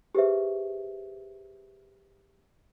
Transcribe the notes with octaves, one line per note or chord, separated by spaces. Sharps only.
G4 G#4 B4 C5 E5